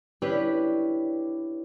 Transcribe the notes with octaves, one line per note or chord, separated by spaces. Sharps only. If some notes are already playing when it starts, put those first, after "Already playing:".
C#4 D4 E4 G4 B4